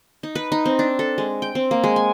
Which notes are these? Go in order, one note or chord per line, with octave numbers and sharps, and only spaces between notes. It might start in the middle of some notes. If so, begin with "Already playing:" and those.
D#4
B4
D#4
C4
D4
A4
G#3
G5
C4
A#3
G#3
G#5